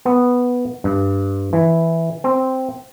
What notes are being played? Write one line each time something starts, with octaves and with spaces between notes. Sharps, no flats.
B3
G2
E3
C4